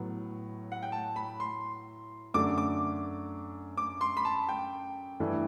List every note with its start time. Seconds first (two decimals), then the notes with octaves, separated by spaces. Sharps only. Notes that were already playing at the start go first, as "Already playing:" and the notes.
Already playing: A2 F#3 B3
0.72 F#5
0.82 G5
0.92 A5
1.16 B5
1.40 C6
2.34 F#2 D3 A3 D6
2.58 D6
3.77 D6
4.01 C6
4.17 B5
4.25 A5
4.49 G5
5.20 G2 E3 A3 E4